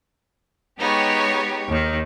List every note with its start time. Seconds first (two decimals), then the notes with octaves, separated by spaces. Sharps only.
0.79 G#3 B3 D#4 G4 C#5
1.69 D#2 D#3